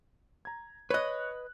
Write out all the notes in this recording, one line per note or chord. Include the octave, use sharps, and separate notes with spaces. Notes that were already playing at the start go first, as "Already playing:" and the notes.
A#5 G#6
B4 C#5 D#5 F#6